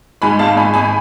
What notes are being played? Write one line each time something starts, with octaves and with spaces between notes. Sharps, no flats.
G#2 G#5 B5
G#1 F5 A5
G#1 G#5 B5
G#1 G#5 B5